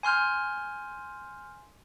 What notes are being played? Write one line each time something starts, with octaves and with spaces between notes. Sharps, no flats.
G#5 C6 F6 G6